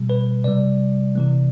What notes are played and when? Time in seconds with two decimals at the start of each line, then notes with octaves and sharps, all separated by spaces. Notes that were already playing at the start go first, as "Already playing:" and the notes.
Already playing: B2 G3
0.10 B4
0.44 C3 G3 D5
1.15 C3 E3 A3